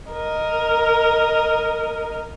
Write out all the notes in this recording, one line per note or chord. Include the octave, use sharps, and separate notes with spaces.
A#4 D#5